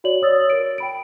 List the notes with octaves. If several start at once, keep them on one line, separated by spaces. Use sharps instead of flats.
F#4 C#5 D5 F#7
C#5 D5 D#6 E6 A6
A#4 D7
G5 B5 D7